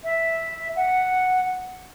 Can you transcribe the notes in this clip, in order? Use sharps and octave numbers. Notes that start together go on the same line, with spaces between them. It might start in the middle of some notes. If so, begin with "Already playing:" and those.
E5
F#5